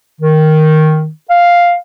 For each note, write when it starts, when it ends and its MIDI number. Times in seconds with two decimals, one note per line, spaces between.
0.21 1.10 51
1.30 1.75 77